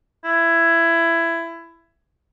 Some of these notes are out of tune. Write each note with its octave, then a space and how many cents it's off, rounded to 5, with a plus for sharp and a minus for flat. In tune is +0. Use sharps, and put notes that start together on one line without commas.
E4 +15